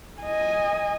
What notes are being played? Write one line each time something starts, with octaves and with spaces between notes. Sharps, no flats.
D#5 G#5